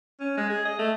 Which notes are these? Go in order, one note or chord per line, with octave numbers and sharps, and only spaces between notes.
C#4
G#3
G#4
D#5
A3